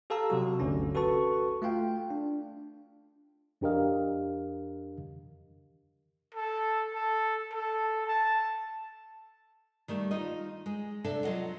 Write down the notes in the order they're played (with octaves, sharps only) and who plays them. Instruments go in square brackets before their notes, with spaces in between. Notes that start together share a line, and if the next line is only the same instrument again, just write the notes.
[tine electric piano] G4 A4 F5 A5 A#5 E6
C3 F#3 F#4
G1 D2 D3 C#4
F#4 A4 B4 A5 C#6
A3 F4 F5 G5
D4
[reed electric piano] F2 D4 G4 A#4 D#5 F5
[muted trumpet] A4
A4
A4
A5
[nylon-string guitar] D#3 G3 A3
D#4 F4 D#5
G#3
C3 D4 A4 E5
F#3 F4 D#5 F#5